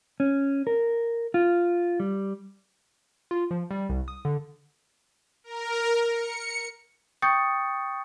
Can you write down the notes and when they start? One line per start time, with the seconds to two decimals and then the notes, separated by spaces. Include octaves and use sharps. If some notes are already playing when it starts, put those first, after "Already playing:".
0.20 C#4
0.67 A#4
1.34 F4
2.00 G3
3.31 F4
3.51 F3
3.71 G3
3.89 C2
4.08 D#6
4.25 D3
5.44 A#4
6.13 C#7
7.22 G5 C#6 D#6 G6 A6 C#7